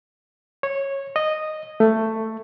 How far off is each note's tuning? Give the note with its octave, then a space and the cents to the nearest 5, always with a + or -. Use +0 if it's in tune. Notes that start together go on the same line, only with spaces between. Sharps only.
C#5 -15
D#5 -10
A3 +10